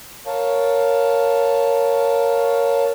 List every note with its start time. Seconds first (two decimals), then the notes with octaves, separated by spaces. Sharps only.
0.27 A#4 C#5 F5 A5